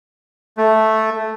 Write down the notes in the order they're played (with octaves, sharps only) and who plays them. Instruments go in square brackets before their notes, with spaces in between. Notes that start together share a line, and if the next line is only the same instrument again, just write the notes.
[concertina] A3